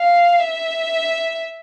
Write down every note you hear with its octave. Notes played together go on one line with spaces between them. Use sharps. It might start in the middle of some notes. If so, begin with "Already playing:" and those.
Already playing: F5
E5